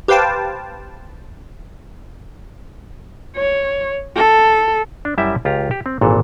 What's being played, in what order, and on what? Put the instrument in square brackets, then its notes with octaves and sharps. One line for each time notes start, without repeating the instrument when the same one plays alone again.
[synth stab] G4 B4 C5 F5 G5 A5
[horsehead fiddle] C#5
A4
[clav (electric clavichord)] D4
F#2 G3 E4 E5 G5
C#2 F4 G4 A#5
G4
C4
G#1 A#2 E3 A4